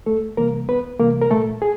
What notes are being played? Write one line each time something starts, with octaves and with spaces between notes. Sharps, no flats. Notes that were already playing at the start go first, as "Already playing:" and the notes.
C#2 A3 A4
C3 E3 G3 A#3 A#4
C#2 B3 B4
C3 E3 G3 A#3 A#4
A#4
A#2 A3 A4
G#4